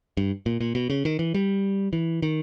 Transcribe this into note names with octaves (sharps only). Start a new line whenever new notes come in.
G2
A#2
A#2
B2
C#3
D#3
E3
G3
E3
D#3